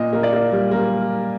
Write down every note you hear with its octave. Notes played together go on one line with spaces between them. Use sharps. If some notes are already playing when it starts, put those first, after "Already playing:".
Already playing: A#2 D#5
A#3
D5
A#3
G3
A#3